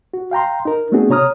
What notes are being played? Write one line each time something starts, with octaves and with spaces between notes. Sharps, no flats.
F#4
F5 G5 A#5 C6
D#4 A#4
A3 B3 C4 D4 F#4 G#4
C3 C#5 A#5 D#6 F6